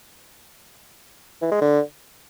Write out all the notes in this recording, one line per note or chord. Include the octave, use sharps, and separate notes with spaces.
E3
G#3
D3